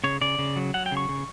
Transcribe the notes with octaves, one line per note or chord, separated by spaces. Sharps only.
C#3 C#5
C#3 D5
C#3
F#3
F#3 F#5
G5
C#3
C#6
C#3